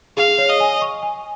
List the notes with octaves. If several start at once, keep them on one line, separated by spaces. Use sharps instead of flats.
G#4 F5
C#5
D#5
G#5
C#6
G#5